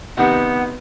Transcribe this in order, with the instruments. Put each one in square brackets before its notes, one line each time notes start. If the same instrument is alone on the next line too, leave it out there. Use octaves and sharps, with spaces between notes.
[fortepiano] C3 D#3 [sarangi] B3 [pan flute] F#5